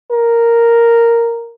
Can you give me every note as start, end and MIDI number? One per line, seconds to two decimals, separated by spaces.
0.11 1.54 70